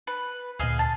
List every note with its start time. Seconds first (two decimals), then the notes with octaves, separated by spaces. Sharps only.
0.07 B4
0.59 D2 A#2 G#4 D#5 F5
0.79 A5